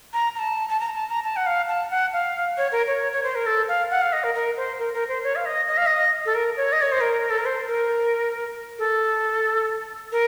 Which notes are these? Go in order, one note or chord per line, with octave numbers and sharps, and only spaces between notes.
A#5
A#5
A5
A5
A#5
A5
A#5
A5
F#5
F5
A5
F#5
F5
C#5
A#4
C#5
C#5
C5
A#4
A4
F5
F#5
F5
D#5
A#4
A#4
C5
A#4
A#4
C5
C#5
F5
D#5
D#5
F5
D#5
A4
A#4
C#5
D#5
C#5
C5
A#4
A4
A#4
C5
A#4
A4
A#4